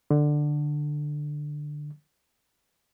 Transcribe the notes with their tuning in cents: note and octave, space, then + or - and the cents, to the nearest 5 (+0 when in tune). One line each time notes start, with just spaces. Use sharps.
D3 +10